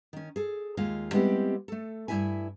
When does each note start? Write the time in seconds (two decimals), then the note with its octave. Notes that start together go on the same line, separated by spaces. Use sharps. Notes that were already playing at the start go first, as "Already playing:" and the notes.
0.13 D#3 C#4
0.36 G#4 A4
0.77 D#2 G#3 F4 D#5 F5
1.12 G3 G#3 B3 C4 E4 G4
1.68 A3 A4
2.08 G2 G#3 E4 E5 G#5